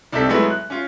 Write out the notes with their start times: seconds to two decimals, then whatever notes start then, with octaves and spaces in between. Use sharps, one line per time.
0.12 C2 C4 D#4 A4 B6
0.29 F#3 G#3 A3 B3 E4
0.50 F#6
0.70 C#4 F4